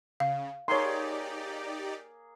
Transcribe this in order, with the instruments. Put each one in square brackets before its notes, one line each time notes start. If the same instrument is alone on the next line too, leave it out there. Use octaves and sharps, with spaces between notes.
[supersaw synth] C#3 [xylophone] F5
[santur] A#3 G#4 [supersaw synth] D#4 G4 D5 [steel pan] C#5 C6